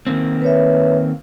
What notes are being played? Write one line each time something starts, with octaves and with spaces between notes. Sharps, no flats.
D#3 A#3 C4
B4 C#5 E5